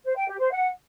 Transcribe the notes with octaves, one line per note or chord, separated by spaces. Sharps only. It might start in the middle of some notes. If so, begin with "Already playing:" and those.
C5
G5
G4
C5
F#5